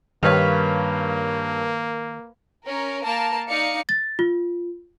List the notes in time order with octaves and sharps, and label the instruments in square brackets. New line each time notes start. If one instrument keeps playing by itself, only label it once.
[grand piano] G2 C#5 [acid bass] D#3 [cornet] A#3 [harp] B4 F5
[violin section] C#4 A#4
A#3 A#4 A5
D#4 D5 F5 C#7
[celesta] A6
F4